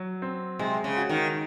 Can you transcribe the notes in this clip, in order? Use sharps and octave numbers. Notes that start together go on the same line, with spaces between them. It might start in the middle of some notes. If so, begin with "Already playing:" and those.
Already playing: F#3
C4
C3 G#3
C#3
F#4
D#3